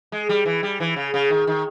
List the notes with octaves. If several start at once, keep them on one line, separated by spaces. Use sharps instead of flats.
G#3
G3
E3
G3
E3
C#3
C#3
D#3
D#3